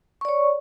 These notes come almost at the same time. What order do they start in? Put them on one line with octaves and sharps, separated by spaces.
C#6 D5 C#5